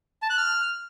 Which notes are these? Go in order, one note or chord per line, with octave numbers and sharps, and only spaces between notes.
A5
F#6
F6